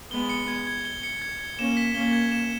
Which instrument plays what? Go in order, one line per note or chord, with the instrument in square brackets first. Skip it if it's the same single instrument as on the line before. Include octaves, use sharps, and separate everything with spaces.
[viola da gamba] G#3 B3 [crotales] G7
[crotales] C#7
G#6
G#6
G7
C#7
G#6
G#6
[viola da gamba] A#3 C#4 [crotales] E7
[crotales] B6
[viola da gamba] A#3 C#4 [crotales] G7
[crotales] G#6
E7